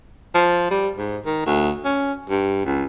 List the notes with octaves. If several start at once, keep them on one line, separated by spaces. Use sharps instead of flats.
F3
G3
G#2
D#3
D2
C#4
G2
C#2